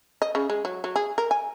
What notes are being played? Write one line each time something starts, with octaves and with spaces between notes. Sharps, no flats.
D#5
C#3
G#3
F#3
F#3
G#4
A#4
G#5